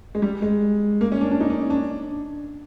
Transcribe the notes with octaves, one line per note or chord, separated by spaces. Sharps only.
G#3
G3
G#3
A#3
C#4
D4
D4
D#4
D4
D4